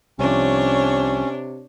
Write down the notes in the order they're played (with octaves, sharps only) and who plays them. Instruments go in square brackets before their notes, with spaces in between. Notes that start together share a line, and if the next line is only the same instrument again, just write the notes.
[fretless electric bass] C2 F3 [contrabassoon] C3 [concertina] C#4 [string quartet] D4 C#5